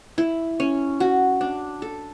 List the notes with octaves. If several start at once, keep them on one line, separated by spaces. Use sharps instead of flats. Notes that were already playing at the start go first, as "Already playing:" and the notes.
E4
C#4
F#4
D4
A4